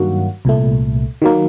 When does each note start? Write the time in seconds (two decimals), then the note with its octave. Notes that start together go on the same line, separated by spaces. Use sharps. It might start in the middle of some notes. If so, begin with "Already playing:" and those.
Already playing: G2 D#3 F#3 A#3 F#4
0.45 C2 A#2 A3
1.22 D#3 F#3 A#3